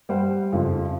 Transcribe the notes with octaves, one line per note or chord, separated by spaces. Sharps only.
G3 C5 F#5
F2 C#3 F3 G#3